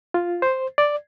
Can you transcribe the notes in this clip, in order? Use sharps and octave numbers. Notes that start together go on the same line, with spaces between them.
F4
C5
D5